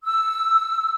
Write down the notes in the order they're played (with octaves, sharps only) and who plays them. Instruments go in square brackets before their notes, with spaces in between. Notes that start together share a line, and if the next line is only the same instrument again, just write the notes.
[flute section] E6